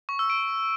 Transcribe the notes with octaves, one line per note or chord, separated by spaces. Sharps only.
C#6
E6
D7